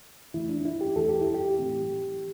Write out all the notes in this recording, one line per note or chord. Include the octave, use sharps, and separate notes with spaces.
E2 E3 A3 E4
D4
D4
E4
G4
E2 E3 A3 A4
G4
E4
G4
A2 E3 A3 C4